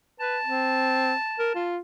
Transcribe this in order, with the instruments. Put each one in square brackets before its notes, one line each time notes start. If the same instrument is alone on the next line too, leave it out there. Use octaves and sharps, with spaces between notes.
[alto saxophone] B4 [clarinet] A5
[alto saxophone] C4
A#4
F4